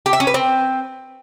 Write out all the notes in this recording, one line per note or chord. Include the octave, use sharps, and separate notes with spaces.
G4
E5
C#4
B4
C4